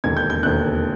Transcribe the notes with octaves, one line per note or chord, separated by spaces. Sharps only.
E1 D#2 D3 G#6
G6
G6
E1 D#2 D3 F#6